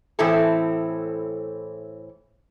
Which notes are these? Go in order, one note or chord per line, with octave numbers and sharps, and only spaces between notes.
A2 E3 C4 E4 A4